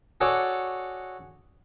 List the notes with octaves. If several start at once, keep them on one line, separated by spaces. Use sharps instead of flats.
F#4 G#4 A4 C#5 D5